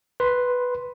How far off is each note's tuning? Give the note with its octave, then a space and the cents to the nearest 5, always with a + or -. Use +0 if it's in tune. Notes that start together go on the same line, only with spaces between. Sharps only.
B4 +0 C6 +0